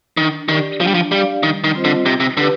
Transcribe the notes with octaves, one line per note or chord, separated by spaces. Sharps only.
D#3 D4
D#3 G4 D5
F3 D4
G3
F3
G3 G4 D5 F5
D#3 G3
D#3
C4 F4 C5 D#5
D3
C3 D#4
C3
D3 G4 B4